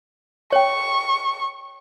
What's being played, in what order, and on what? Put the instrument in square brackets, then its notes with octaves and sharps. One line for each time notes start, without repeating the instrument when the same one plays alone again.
[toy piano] C#5 G5 [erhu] C#6